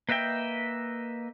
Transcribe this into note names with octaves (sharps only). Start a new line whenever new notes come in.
A#3 B4 D#5 E5 G5